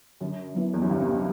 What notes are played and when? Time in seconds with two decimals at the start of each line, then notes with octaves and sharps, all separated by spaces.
0.21 F#2 D3
0.55 F#3 B3 E4
0.74 E2
0.82 F#2
0.90 G2 D3
0.99 C3
1.06 B2